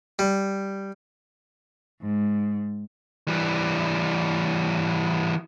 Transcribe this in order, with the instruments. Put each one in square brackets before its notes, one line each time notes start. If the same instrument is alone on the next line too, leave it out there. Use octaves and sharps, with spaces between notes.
[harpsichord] G3
[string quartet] G#2
[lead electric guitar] E3 G3